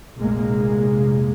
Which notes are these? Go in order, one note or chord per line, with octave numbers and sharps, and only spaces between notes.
F1 A#1 C3 G#3 A#3